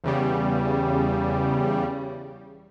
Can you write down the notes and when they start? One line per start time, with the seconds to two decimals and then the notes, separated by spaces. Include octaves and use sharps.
0.04 E2 C#3 G3